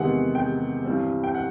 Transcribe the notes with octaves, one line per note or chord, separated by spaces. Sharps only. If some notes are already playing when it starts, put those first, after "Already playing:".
Already playing: E2 C3 D#3 G#3 B3 F#5
G5
G2 E3 G3 C4
G5
F#5